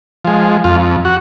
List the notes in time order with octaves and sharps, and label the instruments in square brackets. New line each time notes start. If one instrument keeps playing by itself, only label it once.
[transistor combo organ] F3 G#3
F2 F4
F#4